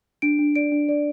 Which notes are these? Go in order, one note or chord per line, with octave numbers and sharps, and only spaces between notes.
D4 D7
D4
D5 D7
D4
D5